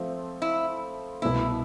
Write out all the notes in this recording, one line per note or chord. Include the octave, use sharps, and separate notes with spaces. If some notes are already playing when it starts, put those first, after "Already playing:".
Already playing: F3 A3 C4
E4
C2 B2 B3 E4